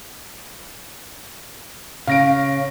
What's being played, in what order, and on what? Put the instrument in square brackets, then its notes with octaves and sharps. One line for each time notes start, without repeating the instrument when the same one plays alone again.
[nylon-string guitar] C#3 [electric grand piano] F5 A#6 D7